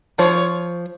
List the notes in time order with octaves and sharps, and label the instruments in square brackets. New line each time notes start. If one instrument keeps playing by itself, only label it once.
[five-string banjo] F3 [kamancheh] C#5